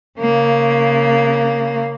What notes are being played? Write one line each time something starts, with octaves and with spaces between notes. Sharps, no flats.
C#3 A#3